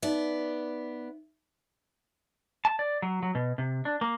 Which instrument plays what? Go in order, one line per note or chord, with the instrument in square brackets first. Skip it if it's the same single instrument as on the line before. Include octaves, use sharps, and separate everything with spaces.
[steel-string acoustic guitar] B3 D5 [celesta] D#4 E5
[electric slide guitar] A5
D5
F#3
F#3
B2
C3
D4
A#3